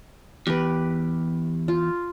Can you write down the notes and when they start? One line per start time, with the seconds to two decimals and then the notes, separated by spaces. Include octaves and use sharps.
0.47 E2 G4 B4
1.68 F4